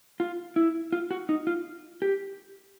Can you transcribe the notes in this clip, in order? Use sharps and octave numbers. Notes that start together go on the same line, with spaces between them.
F4
E4
F4
F#4
D#4
F4
G4